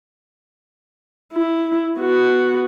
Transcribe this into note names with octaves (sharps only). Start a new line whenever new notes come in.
E4
B3 F#4